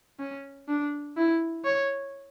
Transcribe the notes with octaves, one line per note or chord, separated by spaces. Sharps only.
C#4
D4
E4
C#5